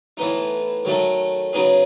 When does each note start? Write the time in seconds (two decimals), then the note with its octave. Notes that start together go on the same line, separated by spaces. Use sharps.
0.17 A2 E3 B3 D#4
0.85 D#3 F#3 A3 D#4
1.53 C#3 F#3 B3 D#4 G#4